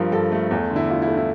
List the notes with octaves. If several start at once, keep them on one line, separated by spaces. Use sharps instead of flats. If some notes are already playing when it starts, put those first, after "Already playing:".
Already playing: G2 F3 A#4
G2 A4
A3
E2
D3
E4
E2 F4
E4
A3
E4